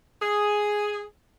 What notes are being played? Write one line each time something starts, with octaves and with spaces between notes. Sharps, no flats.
G#4